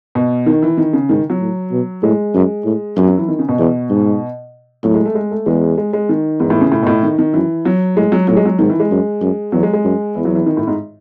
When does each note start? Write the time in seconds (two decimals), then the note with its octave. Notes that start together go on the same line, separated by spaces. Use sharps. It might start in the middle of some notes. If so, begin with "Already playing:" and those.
0.15 B2
0.46 D#3
0.62 E3
0.77 D#3
0.93 C#3
1.09 G#2 D#3
1.30 F#3
1.41 A2
1.72 B2
2.03 A2 G#3
2.34 F#2
2.65 A2
2.97 F#2 F#3
3.07 F#3
3.17 E3
3.28 D#3
3.39 C#3
3.49 B2
3.59 E2
3.90 G#2
4.83 A2 F#3
4.94 G#3
5.05 A3
5.15 G#3
5.31 A3
5.46 E2 G#3
5.78 G#3
5.93 G#3
6.09 D#3
6.40 E2 G#2
6.50 A2
6.61 C#3
6.72 A2
6.83 B2
6.87 A2
7.03 D#3
7.18 D#3
7.33 F#2 E3
7.65 F#3
7.96 A2 G#3
8.12 F#3
8.28 A2 F#3
8.37 G#3
8.46 F#3
8.59 G#2 D#3
8.70 E3
8.80 G#3
8.91 F#2
9.21 F#2
9.52 E2 F#3
9.63 G#3
9.73 G#3
9.85 F#2
10.15 E2 E3
10.25 F#3
10.35 E3
10.46 D#3
10.57 A2
10.67 G#2